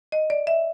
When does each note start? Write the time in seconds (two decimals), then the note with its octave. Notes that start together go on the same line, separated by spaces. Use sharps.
0.12 D#5
0.30 D5
0.47 E5